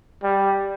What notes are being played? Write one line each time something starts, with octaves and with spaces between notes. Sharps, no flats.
G3